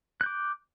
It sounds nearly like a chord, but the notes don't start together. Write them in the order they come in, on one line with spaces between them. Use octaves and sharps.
F#6 G6 D6